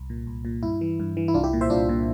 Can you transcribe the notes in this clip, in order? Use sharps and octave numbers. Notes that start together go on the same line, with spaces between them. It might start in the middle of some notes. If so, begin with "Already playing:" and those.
Already playing: C2
A#2
C2
A#2
G2 E4
E3
G2
E3
E4
C2 D4 F4
E4 G4
A#2
C5 E5
C2 D4 F4
A#2